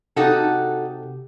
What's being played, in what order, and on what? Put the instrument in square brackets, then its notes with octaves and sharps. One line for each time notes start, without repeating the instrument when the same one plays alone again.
[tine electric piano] C3 G4 [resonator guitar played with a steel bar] D#4 F#4 A4